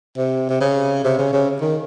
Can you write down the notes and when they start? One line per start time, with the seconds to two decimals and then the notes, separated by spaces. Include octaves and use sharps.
0.18 C3
0.50 C3
0.61 C#3
1.04 C3
1.19 C#3
1.33 C#3
1.61 D#3